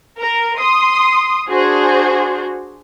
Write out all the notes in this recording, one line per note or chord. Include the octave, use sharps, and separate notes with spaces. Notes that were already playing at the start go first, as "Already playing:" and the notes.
A#4
C6 D#6
D4 F#4 G#4 C5